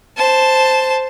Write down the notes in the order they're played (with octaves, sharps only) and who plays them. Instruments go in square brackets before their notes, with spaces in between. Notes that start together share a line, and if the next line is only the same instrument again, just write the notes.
[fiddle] C5 A5